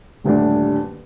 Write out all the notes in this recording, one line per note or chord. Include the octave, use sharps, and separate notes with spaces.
D#1 D2 G2 D4